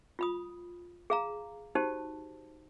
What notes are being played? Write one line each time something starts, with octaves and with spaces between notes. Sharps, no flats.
F4 B5 D#6
G#4 F5 A#5
D#4 F#4 G4 C5 A5